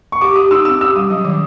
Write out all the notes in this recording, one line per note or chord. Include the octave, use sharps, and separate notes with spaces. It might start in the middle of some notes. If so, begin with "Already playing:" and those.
C#6
G4 D6
G4 D#6
D#4 E6
C4 E6
G4 E6
G3 D#6
F#3
D#3